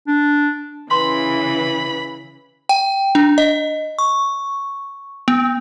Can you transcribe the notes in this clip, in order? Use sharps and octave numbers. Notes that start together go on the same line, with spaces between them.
D4
C#3 E3 B4 B5 C6
G5
D4
D#5
C#6
B3